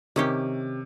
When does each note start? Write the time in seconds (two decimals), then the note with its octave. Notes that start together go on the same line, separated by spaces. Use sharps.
0.16 C3 D#3 C#4 G4